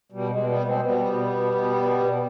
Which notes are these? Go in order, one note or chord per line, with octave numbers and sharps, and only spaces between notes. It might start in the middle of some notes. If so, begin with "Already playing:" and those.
B2 G3
G#3
B2
G3 B3
B2
G#3 C4
B2 G3 B3
B2
B2
B2
B2
B2